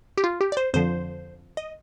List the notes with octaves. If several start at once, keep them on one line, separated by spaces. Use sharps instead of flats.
G4
F4
G4
D5
C5
F2 D3 F3 C5
D#5